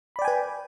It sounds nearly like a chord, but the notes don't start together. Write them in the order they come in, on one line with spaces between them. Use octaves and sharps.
B5 D5 G5 G#5 B4